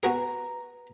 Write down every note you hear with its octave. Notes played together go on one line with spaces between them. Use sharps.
B3 F#4 G#4 B4 A#5